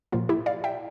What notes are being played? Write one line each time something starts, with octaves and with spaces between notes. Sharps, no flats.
A#2 F3 A#3 F4
E4 G4
D5 F5
E5 G5